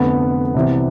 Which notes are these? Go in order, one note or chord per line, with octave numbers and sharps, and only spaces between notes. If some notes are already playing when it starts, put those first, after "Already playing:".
Already playing: F1 F2 D3 B3
C2 C3 E3